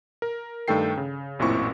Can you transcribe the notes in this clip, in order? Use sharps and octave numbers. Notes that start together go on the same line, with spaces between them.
A#4
G2 D#3 A3 A4 G5 C7
C#3
A1 F#2 A#2 C4 E4 C#6